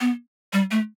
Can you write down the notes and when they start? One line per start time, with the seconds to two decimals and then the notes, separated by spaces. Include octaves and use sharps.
0.01 B3
0.53 G3
0.71 A3